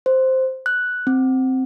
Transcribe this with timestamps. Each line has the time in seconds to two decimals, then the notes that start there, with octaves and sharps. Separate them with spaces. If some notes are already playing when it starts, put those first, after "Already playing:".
0.06 C5
0.66 F#6
1.07 C4